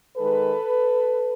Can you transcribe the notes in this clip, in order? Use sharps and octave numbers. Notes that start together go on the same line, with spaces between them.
D#3 G#3 A4 B4